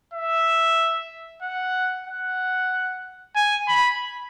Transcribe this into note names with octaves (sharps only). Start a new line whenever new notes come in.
E5
F#5
F#5
G#5
B5